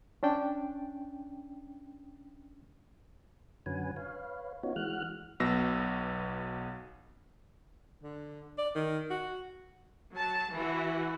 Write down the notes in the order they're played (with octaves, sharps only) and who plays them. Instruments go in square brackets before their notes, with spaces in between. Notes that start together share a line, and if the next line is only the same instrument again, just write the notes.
[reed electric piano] C#4 D4 G5
[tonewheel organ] F#2 D3 C#4 F#4 B4 G#5
B4 C#5 F5
B3 C#4 D#4 F4 F#4 C#5
E3 G#3 F#4 F6 F#6
[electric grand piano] B1 B2 B3 E6 A#6
[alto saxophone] D3
D5
D#3
F#4
[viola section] F#3 A5
E3 F#4